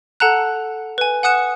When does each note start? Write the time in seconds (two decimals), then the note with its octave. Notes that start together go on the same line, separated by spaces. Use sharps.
0.20 A4 F#5 A5 A#5 F#6
0.98 B4 G#5
1.23 F#5 G#5 D#6 F#6 C#7 E7